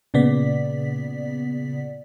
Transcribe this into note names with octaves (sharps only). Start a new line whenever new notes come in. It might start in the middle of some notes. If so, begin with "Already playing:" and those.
A#2 C#3 B3 D5 B6